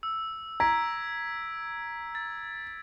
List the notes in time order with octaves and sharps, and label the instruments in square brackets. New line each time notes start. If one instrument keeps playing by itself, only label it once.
[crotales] E6
[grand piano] A#5 [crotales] G#6 B6 D7
[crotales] A6